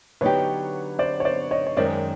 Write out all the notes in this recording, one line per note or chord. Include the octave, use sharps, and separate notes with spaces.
D3 F#3 B3 D#4 G4 B4 C#5
C5 D5
C#5
C5 D5
C#5 D#5
C#5
F#2 D#3 G#3 C#4 C5 D5